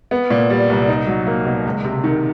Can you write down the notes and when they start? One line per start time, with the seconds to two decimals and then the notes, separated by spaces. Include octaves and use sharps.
0.11 B3
0.30 A#2
0.50 G3
0.69 C2
0.88 D#4
1.07 F#3
1.27 A#3
1.45 B2
1.66 C#2
1.84 C3
2.04 D#3